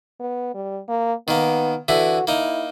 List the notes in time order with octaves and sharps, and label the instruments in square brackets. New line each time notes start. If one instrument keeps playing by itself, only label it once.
[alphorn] B3
G3
A#3
[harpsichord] D#3 A#3 [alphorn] B3
[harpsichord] D3 E3 E4 [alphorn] F#4
[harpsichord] A#3 D#4 [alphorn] E4